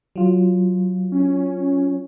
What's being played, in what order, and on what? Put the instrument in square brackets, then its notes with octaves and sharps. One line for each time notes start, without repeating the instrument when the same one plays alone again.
[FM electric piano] F#3 F4
[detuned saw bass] C#4